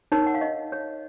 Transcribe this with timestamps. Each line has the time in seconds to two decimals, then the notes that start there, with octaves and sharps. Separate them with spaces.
0.12 D#4 A#4 C#5
0.27 F#5
0.34 F5
0.41 D#5
0.72 C#5